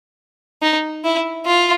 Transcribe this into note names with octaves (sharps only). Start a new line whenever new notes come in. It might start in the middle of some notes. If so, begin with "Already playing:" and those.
D#4
E4
F4